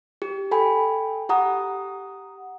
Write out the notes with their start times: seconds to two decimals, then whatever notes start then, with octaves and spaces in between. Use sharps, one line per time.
0.22 G4
0.51 A4 G5 G#5 B5
1.29 G4 F#5 A#5 D#6